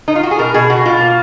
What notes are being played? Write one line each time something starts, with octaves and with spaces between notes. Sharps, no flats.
D#4
F4
F#4
G#4
B2 A#4
B2 G#4
B2 F#4
B2 F4
A#3